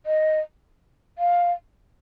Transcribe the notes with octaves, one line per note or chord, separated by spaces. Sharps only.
D#5
F5